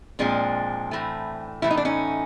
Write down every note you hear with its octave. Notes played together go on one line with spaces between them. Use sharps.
A#2 F3 G#3 C4 D4
A2 E3 A3
A2 E3 A3 E4
D#4
D4
C#4 D#4